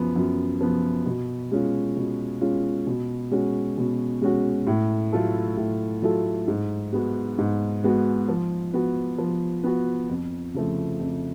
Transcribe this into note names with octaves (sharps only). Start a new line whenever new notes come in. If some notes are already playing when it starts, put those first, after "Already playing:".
Already playing: F#2 F3 B3
F#2
F3 B3
B2
G#3 C#4 F4
B2
G#3 C#4 F4
B2
G#3 C#4 F#4
B2
G#3 C#4 F#4
A2
F#3 A3 F4 A4
A2
F#3 A3 F4 A4
G#2
G#3 B3 F#4
G#2
G#3 B3 F#4
F3
B3 F#4
F3
B3 F#4
F2
C#3 F3 A3
F2